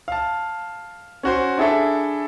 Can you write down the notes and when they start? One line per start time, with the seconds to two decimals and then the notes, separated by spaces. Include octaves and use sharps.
0.08 F5 A5
1.23 C#4 F#4 C5
1.58 D4 E4 G#4 A4 E5